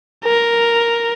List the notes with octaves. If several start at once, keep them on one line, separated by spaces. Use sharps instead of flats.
A#4